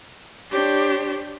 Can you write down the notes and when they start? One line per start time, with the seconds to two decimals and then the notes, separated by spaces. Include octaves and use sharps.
0.50 D4 G4 C5 C#5